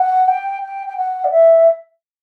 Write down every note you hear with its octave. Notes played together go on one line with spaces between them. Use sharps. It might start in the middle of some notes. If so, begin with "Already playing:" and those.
Already playing: F#5
G5
G5
G5
F#5
D5
E5